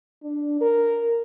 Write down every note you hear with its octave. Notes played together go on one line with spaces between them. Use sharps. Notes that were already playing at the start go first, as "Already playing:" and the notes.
D4
A#4